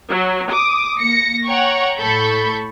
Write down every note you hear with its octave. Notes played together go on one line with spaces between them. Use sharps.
F#3
D6 D#6
A#3 A#6 C#7
C#5 F#5 G5 A#5 C#6
A2 A4 B5 C#6 G6